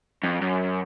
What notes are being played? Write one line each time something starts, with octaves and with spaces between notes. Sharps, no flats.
F2
F#2